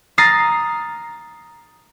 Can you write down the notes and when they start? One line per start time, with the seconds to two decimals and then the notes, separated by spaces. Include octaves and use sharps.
0.18 A#5 D#6 F6 A6 A#6 C7